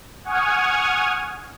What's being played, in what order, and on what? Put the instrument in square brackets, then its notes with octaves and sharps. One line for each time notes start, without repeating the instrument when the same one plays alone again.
[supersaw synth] F#5 G#5 C#6 D#6 F6 G#6